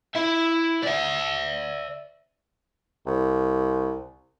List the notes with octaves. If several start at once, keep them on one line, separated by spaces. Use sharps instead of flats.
E4 E5
D5 E5
C2